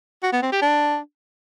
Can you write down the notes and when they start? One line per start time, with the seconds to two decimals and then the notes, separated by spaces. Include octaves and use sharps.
0.23 F#4
0.33 B3
0.42 C4
0.52 G4
0.62 D4